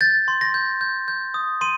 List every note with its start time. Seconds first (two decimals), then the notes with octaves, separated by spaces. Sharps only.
0.01 G6 A6
0.28 C6
0.41 A#6
0.54 G6
0.81 G6
1.08 G6
1.34 D#6
1.61 C6 D#7